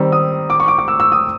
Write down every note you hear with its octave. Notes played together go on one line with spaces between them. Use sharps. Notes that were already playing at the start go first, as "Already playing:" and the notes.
Already playing: D#3 G3 C4 E6
D#6
D6
C#6
D6
D6
E6
E6
D#6